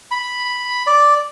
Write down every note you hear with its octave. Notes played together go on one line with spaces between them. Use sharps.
B5
D5